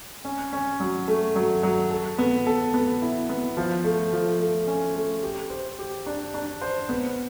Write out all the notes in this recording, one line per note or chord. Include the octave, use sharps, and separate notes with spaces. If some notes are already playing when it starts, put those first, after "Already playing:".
C#4
C#4
F#3
A3
F#3
F#3
A4
B3
A4
B3
E4
B3
F3
A3
F3
A3
C#4
A3
G4
C5
G4
D4
D4
C5
B3